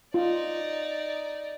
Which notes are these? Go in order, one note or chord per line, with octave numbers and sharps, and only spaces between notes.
D#4 F4 D5